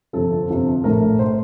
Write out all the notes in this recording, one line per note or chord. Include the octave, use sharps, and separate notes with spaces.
G1 F2 C3 F3 A4
G1 F2 C3 F3
A#1 A2 A3 A#4
A2 A3 C5